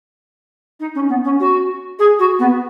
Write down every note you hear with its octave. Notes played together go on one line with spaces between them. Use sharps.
D#4
C#4
B3
C#4
F#4
G#4
F#4
B3